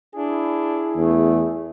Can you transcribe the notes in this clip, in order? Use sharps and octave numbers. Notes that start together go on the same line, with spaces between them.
D4 E4 G#4
E2 A3